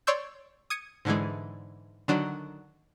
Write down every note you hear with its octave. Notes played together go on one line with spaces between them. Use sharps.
C#5 D5 C6 C#6 E6 G6
D#6 G#6 C#7 D#7
G#2 D3 E3 G#3
D3 D#3 F#3 D4